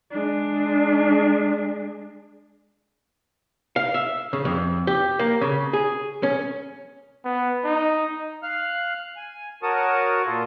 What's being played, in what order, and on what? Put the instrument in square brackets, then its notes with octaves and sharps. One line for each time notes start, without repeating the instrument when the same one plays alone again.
[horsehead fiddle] G#3 D4
[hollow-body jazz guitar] F5
E5
C#3
F2
G4
A#3
C#3
G#4
C#4
[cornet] B3
D#4
[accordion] F5 F6 F#6
G#5
F#4 A#4 C#5 A5 D#6
A#2 F4 A4